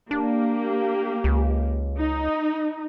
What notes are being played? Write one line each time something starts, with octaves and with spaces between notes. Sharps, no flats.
A#3 D4 G4
C#2
D#4